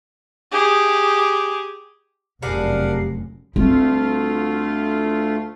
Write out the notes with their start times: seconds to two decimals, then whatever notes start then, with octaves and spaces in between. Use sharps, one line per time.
0.52 G4 G#4
2.42 F1 F#2 G3 D4 G#4 A#4 F5 F#5
3.56 D2 G3 A3 C4 F4